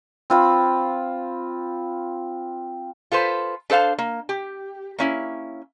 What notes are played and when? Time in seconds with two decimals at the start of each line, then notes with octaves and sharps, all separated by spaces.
0.30 C4 F4 B5
3.12 F4 A4 B4 C5
3.70 D4 A4 C5 F5 A5
3.98 A#3
4.29 G4
4.99 A#3 C#4 E4